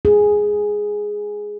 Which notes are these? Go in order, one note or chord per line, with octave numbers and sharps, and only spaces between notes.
G#4